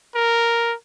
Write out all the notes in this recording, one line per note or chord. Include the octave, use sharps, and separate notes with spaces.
A#4